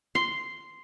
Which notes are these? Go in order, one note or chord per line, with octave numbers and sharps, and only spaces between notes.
C6